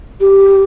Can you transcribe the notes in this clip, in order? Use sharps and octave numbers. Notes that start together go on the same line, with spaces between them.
G4